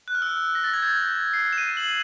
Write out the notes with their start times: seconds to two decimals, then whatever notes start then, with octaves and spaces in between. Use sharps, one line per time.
0.08 F#6
0.15 F6
0.22 E6
0.29 F6
0.55 A#6
0.64 A6
0.73 G#6
0.83 G6
1.08 G6
1.33 C7
1.53 E7
1.58 D#7
1.77 F#7